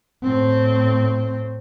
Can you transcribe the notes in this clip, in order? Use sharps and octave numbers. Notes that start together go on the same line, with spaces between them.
A2 C4